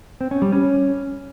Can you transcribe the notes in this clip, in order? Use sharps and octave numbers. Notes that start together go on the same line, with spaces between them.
C4
C#4
G3
C#4